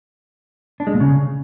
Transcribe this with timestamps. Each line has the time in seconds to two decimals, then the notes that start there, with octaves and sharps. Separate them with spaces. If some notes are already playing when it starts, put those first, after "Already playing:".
0.80 D4
0.87 G#3
0.94 A#2
1.00 C#3